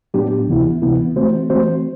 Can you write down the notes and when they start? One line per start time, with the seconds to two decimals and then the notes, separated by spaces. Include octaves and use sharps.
0.14 A2 F#3 B3 D4 G4
0.48 D2 C3 E3 B3 E4
0.82 D2 C3 E3 B3 E4
1.16 E3 A3 C4 F#4 C5
1.49 E3 A3 C4 F#4 C5